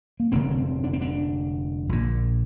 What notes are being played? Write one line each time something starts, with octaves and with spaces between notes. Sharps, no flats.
A#3
F1 F2 D3 C4
C4
D4
C4
D4
A#1 A#2